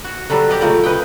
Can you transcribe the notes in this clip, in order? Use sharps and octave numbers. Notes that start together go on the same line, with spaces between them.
F#4
D3 F#3 G3 A4
G4 D5 D#5
A#2 C#3 F#3 A3
B4 D#5 G5